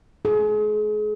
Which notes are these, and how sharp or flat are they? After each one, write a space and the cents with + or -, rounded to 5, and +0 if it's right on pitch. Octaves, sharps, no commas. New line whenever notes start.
G#4 +35